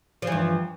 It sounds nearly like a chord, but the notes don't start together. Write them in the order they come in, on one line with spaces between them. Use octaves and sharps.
F3 E3 G2